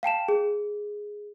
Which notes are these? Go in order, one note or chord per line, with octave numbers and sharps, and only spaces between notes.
F5 G5 A5 E7
G#4